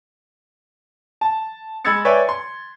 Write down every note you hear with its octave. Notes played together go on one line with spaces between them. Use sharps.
A5
G#3 B5 E6 G#6 A6 C#7
B4 C#5 D5 E5 G5 G#5
C6